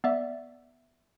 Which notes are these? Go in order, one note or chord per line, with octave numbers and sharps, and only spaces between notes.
B3 D5 E5